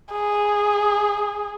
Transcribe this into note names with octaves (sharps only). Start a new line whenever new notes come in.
G#4